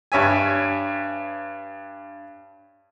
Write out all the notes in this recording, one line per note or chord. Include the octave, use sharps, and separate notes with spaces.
G2 C#5 E5 G#5